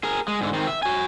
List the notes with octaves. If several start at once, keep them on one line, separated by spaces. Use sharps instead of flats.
G#4 A#4
G#3
G#2 D3
D#3 C4
E5
F#4 G#5